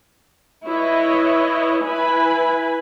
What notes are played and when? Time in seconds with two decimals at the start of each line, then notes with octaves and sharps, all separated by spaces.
0.66 E4 B4 C#5 D#5
1.84 E4 B4 G#5 B5